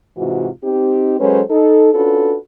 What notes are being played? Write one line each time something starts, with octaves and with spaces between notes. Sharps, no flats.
G#2 C3 E3 F4 F#4
C4 D#4 G4
F#3 G#3 C#4 A4 B4 C5
D#4 A4
C#4 D4 F4 F#4 A4 B4